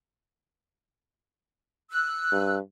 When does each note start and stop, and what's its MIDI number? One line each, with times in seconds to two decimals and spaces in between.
1.90 2.55 88
1.90 2.55 90
2.32 2.59 43